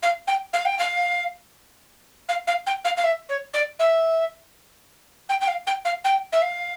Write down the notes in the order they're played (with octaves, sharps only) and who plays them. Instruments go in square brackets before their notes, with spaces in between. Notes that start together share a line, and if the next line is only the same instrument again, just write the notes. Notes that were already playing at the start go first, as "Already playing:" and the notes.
[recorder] F5
G5
F5
G5
F5
F5
F5
G5
F5
F5
E5
C#5
D5
E5
G5
G5
F5
G5
F5
G5
E5
F5